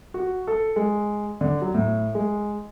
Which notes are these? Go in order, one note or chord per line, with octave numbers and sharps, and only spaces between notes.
F#4
A4
G#3
D3
F#3
A2
G#3